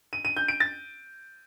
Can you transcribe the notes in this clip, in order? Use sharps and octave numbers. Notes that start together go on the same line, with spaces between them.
D#7
D#7
G6
D7
A6